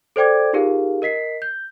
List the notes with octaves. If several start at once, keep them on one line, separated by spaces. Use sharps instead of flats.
A4 C5 D5 G5 D6 G#6
D#4 F4 G4 G#4 A#4 F5
A#4 D#5 B6 C7
G6